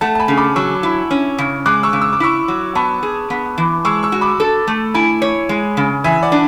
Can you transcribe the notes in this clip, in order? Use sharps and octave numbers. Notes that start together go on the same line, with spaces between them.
A3 F#5 A5
A5
G#5 B5
C#3
B5 D6
F#3 C#6 E6
E4
C#4
C#3
G#3 D6 F#6
C#6 E6
C#3
E6
D6
E4 C#6 E6
F#3
B3 A5 C#6
G#4
B3
E3
G#3 C#6 E6
C#6 E6
F#4
B5 D6
A4
A3
E4 G#5 B5
C#5
G#3
C#3
E3 E5 G#5
D5 F#5
D4